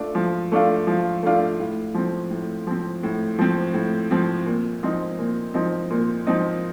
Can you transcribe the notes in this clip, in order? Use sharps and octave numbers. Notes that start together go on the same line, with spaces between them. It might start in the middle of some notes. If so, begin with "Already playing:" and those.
Already playing: A3 D4 F4
F3
A3 D4 F4
F3
A3 D4 F4
A2
F3 C4
A2
F3 C4
A2
F3 C4
A2
F3 C4
A#2
F3 C4 D#4
A#2
F3 C4 D#4
A#2
F3 C4 D#4